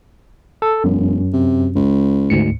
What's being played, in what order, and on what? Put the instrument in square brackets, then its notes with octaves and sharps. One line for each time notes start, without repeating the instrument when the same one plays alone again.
[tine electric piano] A4
[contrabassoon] E1 [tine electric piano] F#2
[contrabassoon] C3
C#2
[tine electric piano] D2 G#2 C#7